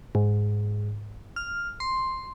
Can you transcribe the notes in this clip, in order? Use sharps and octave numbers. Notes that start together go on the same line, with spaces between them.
G#2
F6
C6